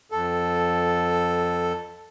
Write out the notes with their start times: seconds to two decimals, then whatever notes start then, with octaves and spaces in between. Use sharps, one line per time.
0.12 F2 A4